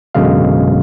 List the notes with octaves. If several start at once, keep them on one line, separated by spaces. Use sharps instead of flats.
A1 F#2 B2 D3 G#3 F5